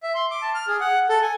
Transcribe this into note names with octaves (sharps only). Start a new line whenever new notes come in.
E5
C6
D6
A5
F6
G#4
F#5
A4
G#5